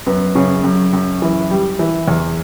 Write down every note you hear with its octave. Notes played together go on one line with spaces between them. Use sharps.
F#2 B3
F#2 C#3 C#4
F#2
F#2
E3
G3
E3
E2